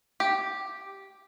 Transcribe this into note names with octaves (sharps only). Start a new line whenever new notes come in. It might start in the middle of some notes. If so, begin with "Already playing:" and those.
G4